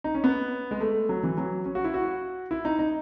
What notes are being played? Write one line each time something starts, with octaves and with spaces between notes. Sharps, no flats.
D#4
C#4
B3
G#3
A3
F#3
E3
F#3
C#4
F#4
E4
F#4
E4
D#4
D#4